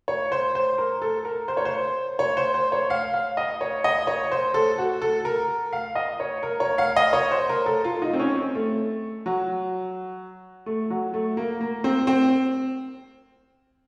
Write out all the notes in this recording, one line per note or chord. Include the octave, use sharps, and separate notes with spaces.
C#5
C5
C5
A#4
A4
A#4
C5
C#5
C5
C#5
C5
C5
C#5
F5
F5
D#5
C#5
D#5
C#5
C5
A4
F#4
A4
A#4
F5
D#5
C#5
A#4
C#5
F5
D#5
C#5
C5
A#4
A4
F4
D#4
C4
C#4
C4
A3
F#3
A3
F#3
A3
A#3
A#3
C4
C4